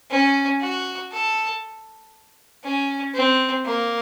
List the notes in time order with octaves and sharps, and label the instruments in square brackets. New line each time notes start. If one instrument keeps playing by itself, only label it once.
[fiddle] C#4
F#4
A4
C#4
C4
A#3